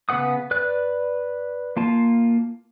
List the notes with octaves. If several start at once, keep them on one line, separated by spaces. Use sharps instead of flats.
C#3 B3 B4 F#5 D#6
B4 D5 F#6
A#3 F4 A5